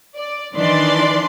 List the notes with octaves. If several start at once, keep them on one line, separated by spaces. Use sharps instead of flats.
D5
D#3 E3 D4 D5 C6